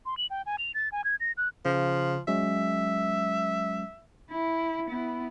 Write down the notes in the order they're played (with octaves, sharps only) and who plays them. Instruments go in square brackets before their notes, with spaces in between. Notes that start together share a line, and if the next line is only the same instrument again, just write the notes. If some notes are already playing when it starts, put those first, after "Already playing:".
[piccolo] C6
F#7
G5
G#5
F7
A6
G#5
G#6
A#6
F#6
[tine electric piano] C#3 [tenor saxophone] F3
[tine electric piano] F#3 G#3 C#4 [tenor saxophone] E5
[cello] E4
B3 E4